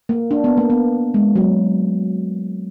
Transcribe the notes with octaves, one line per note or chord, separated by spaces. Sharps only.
A#3
D4
B3
A#3
B3
G#3
F#3